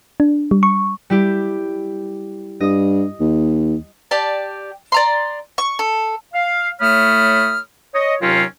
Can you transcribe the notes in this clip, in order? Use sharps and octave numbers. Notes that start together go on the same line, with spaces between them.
D4
G3
C#6
G3 E4 G4
G2 D#5 D#6
D#2
G4 D5 A5
D5 A#5 C6
C#6
A4
F5
A2 A3 C#5 B5 D#6 F6
C#5 D#5
D#2 C3 F#3 C4 C#4 F4